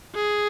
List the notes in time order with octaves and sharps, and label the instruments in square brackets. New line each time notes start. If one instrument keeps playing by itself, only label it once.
[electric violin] G#4